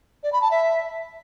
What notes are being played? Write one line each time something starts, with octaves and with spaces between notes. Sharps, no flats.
D5
B5
A5
E5